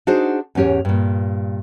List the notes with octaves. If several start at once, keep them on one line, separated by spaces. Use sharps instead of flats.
D4 D#4 F#4 G#4 C5
E2 G#2 C#4 G4 C#5
G2 A#2